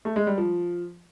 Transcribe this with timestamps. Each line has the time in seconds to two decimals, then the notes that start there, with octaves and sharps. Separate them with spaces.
0.05 A3
0.16 G#3
0.27 G3
0.38 F3